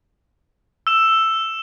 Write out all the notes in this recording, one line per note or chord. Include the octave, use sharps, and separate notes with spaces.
E6 E7